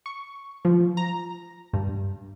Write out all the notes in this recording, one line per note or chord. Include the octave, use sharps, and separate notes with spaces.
C#6
F3
A#5
G2